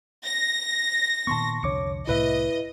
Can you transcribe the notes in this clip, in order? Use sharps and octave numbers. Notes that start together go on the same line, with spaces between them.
A#6
A#2 D#3 B3 A5 C6 C#6
C2 F2 D3 C#5 D6 C#7
C2 A2 E4 B4 D#5 E5